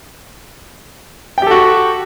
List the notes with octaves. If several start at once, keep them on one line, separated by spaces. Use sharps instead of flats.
F#4 G4 A4 G5